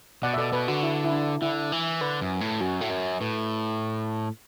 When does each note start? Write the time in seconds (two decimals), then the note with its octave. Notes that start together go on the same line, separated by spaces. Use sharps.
0.23 B2 D5 F#5
0.34 E5
0.38 B2 A4 D5
0.53 B2 B4
0.68 D3 F#4
0.83 E4
1.04 E4
1.12 D4
1.42 D3 E4
1.72 E3
2.01 D3 B4
2.21 F#2
2.41 A2
2.60 F#2 F#4
2.81 A2
2.90 F#2
3.20 A2 B4